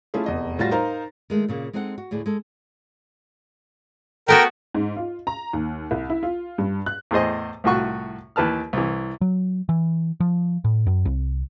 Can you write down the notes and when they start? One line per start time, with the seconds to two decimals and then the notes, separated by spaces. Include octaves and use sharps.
0.14 A3 C#4 E4 F4 G#4
0.26 F1 E2 D#5
0.59 A2 G3 F4 F#4 A6 A#6
0.71 D#4 A#4 C5 F5 A#5
1.30 D#3 G#3 A3
1.48 A#2 C#3 A#3
1.73 G#3 C4 D#4 A4 C#5 F#5
1.98 F#4
2.11 D2 A2 G#4 D5
2.26 G#3 A4
4.28 A3 B3 F#4 A#4 G5
4.74 G#2
4.97 F4
5.27 A#5
5.53 D#2
5.91 C2
6.10 E4
6.23 F4
6.58 G2
6.86 F#6
7.11 E2 A2 G#4 C5 D#5
7.64 C2 A2 F4 F#4 C#6
8.36 D#2 E3 B4 A5 F6
8.73 C2 E3
9.21 F#3
9.69 E3
10.20 F3
10.64 A2
10.86 F#2
11.05 C2